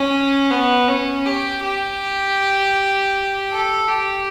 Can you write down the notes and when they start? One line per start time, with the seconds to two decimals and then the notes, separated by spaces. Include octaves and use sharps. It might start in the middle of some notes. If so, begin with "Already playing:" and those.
Already playing: C#4
0.51 B3
0.88 C#4
1.26 G4
1.64 G4
3.51 A4
3.88 G4